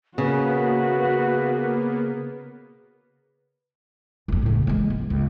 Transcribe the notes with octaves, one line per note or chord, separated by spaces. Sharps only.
C#3 A#3 B3 F#4 B4
F1 F2
A2 C#3
E3 G#3
B3
C#2